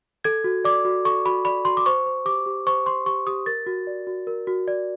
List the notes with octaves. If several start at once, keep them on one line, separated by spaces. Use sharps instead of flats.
A4 G#6
F#4
D5 D6
F#4
A4 C#6
F#4 B5
D5 B5
F#4 C6
D6
C5 C#6
C5
G4 D6
G4
C5 C#6
C5 C6
G4 C#6
G4 D#6
A#4 A6
F#4
D5
F#4
A#4
F#4
D5